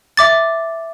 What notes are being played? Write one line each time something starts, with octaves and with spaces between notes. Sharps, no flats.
E5 D6 A6